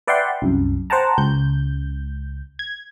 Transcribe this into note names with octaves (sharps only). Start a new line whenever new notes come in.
B4 D5 E5 F#5 G5 C6
C2 F#2
C5 F#5 G5 A5 A#5
C#2 G6
G#6